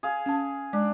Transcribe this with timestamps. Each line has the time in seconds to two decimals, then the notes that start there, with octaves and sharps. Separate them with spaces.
0.03 G#4 F5
0.26 C#4 A5
0.73 G#3 D4